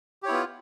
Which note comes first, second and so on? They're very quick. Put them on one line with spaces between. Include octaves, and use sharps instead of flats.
G4 C#5 E4 B3 F4